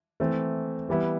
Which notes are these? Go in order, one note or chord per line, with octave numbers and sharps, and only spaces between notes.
E3 A3 C4
E3 G3 B3 E4